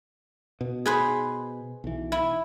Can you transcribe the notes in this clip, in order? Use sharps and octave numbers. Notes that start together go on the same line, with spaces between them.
B2
G#4 B4 C5
B1 E3
E4